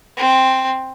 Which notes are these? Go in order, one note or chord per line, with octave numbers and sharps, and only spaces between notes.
C4